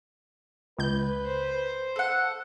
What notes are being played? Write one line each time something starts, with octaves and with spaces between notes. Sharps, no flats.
C#2 B4 G6
C5
A4 F#5